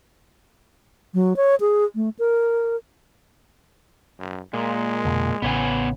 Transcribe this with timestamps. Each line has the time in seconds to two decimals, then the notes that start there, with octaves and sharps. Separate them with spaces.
1.14 F#3
1.36 C#5
1.60 G#4
1.95 A3
2.19 A#4
4.19 F#2
4.53 A#2 G#3
5.05 F2 B2 D3
5.42 A1 C#3 B3 C#5 G#5